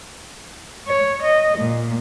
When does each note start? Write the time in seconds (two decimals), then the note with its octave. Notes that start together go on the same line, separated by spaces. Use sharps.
0.88 C#5
1.23 D#5
1.58 A#2